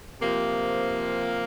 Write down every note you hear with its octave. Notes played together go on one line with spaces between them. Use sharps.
C3 F3 A#3